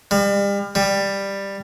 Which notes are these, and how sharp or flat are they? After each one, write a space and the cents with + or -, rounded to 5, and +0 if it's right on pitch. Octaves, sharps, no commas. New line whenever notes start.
G3 +35
G3 +10